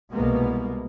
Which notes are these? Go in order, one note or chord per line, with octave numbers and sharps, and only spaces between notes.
C2 B2 G#3 A#3 B3